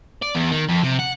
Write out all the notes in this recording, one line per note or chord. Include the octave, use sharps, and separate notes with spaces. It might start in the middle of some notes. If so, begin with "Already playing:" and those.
D5
E2
D#3
F2
C3
F#5